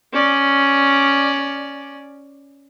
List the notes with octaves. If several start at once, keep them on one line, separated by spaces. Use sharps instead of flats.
C#4 D5